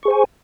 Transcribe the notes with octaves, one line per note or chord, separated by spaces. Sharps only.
G#4 C5 G#5 C#6